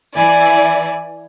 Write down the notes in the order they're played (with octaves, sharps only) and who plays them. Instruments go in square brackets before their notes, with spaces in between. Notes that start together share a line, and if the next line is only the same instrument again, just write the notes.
[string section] E3 E4 D5 [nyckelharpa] G#5